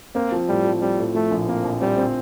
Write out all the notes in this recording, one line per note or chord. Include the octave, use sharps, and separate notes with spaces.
A#3 C4
F3
A2 G3
F3
G3 C4
A2
F3 A3
A#1
A#3 C4
A#1
G3 C4
C4